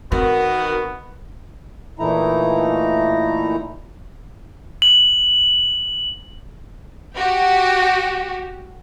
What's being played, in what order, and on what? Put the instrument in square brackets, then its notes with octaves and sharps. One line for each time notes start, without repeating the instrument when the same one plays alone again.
[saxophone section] D#3 F#4 [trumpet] B3 [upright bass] C4 [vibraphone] A#4
[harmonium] A#2 E3 A3 D#4 E4 A#5
[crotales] F#7
[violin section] F#4 G4